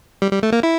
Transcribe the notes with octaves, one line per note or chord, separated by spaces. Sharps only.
G3
G3
A3
A#3
E4